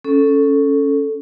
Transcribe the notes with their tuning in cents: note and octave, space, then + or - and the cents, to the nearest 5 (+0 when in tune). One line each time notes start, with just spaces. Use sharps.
C#4 +0 A4 +0